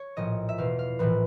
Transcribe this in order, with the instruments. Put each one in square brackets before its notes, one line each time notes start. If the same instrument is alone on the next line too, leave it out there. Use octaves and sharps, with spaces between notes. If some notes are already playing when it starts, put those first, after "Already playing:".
Already playing: [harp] C#5
A#1 A2 F3 D#5
E5
E2 B2 F5
F5
A#1 A2 E3 B4